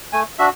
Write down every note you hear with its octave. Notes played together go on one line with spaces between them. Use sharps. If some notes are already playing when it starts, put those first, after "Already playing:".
A3 G#5
D4 F#4 E5